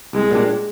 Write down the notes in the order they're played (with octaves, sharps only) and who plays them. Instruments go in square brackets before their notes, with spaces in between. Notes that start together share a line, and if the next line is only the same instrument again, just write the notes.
[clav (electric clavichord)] C2 [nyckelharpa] G#3
[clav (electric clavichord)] A#2 G3 D4